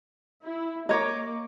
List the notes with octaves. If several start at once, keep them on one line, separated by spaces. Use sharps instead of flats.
E4
A#3 C#5 D#5 A#5 C#6 D6